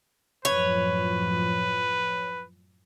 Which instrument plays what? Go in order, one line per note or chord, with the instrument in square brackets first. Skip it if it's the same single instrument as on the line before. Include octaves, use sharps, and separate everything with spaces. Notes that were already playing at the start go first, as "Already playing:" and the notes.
[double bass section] F#2 A2 F3 [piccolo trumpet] B4 [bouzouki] C#5